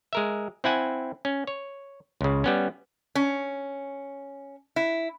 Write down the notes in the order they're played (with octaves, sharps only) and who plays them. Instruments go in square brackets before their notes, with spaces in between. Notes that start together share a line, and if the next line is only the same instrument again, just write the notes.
[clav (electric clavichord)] G#3 A#4 E5
C4 E4 F#5 G#5
C#4
C#5
C#2 C#3
G3 B3 C#4
[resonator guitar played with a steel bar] C#4
E4